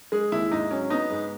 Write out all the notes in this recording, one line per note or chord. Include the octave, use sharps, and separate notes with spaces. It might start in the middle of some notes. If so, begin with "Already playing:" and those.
G#3 G#4
D#2 E4
G#2 D#4
F#3 C#4
B3 D#4
G#2